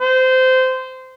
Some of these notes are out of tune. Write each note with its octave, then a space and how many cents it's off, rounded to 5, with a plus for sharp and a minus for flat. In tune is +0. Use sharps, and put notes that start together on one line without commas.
C5 -20